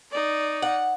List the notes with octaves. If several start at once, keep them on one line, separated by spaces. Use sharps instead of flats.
D#4 D5
F#5